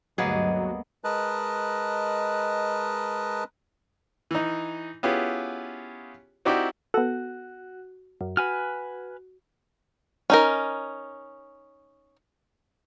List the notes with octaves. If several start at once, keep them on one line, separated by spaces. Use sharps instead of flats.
D2 G2 F#3 A#3 B3 G#4 D#5
G#3 A#4 B4 D#5 A5 F#6
E3 D#4
B3 C#4 E4 F4 G4 G#4
C4 D#4 E4 F#4 G4 D5
B3 F#4 A4
F#2
F#4 B4 G#5 F6
C#4 D#4 A#4